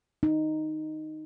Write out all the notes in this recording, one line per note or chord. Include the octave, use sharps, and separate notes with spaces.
D#4